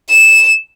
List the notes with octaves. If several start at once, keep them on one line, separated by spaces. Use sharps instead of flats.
E7